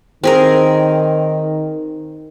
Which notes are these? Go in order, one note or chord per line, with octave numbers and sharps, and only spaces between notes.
D#3 C4 G#4 A#4